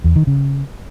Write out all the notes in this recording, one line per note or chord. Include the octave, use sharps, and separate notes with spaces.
E2
D#3
C#3